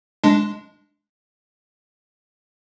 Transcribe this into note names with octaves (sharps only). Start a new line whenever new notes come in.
G#3 D4